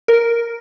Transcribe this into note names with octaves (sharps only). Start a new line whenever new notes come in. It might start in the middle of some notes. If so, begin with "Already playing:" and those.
A#4